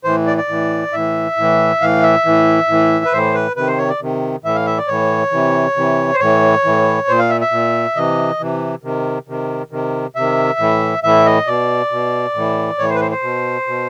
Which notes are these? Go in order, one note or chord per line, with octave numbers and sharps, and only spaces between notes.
A2 E3 C5
D5
D5
A2 E3
A2 E3 E5
A2 E3
A2 E3 F5
E5
A2 E3
A2 E3
B4
A2 E3 C5
B4
C3 D#3 B4
C5
C#5
D5
C3 D#3
A2 E3 E5
F5
E5
D5
A2 E3 C#5
C3 E3
C3 E3
C5
A2 E3 C#5
A2 E3
A#2 C5
F5
E5
E5
A#2
C3 E3 D#5
C3 E3
C3 D#3
C3 D#3
C3 D#3
C3 D#3 E5
A2 E3
A2 E3 E5
D#5
B2 D5
B2
A2 E3
A2 E3 C#5
C5
B4
C5
C5
B2
B2